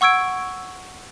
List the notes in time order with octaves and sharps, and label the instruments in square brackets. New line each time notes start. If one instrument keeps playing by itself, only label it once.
[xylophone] F#5 C#6 E6 G#6 D7